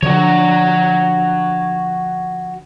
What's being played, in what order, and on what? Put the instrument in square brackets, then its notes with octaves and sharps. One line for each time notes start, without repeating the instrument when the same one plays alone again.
[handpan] D3 [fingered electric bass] F3 [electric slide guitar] F#4 C#5